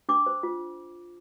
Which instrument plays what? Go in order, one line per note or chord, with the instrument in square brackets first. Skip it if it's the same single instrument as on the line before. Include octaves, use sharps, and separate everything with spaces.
[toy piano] D4 D6
C5
F4